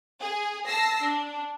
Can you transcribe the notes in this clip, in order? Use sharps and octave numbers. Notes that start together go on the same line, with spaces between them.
G#4
A5 E6 A#6 C7
D4